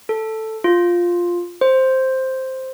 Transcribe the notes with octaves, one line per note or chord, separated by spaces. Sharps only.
A4
F4
C5